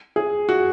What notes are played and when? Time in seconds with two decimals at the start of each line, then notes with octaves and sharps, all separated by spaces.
0.16 G#4
0.49 F#4